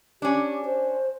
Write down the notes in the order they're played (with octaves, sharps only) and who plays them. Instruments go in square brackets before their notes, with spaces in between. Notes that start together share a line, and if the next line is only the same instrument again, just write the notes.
[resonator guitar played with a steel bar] C#4 D4 [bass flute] G4
[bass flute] C5